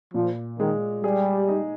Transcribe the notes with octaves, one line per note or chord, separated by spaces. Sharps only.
A#2 F3
D#3 G#3
G3 G#4
D#4